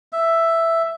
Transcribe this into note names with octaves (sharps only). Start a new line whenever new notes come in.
E5